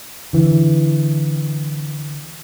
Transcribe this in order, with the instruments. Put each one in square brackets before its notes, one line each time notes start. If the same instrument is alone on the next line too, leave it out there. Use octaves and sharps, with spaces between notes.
[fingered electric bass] D3 E3